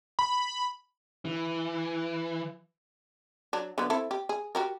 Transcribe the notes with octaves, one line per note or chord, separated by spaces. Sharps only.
B5
E3
F#3 D4
D3 F#3 B3
C4 E4 A4
G4
G#4
F#4 G4 A#4